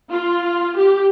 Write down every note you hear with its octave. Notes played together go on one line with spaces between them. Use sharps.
F4
G4